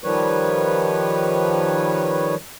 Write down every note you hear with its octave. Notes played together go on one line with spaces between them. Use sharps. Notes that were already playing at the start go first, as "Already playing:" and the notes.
D#3 F3 G3 B4 C#5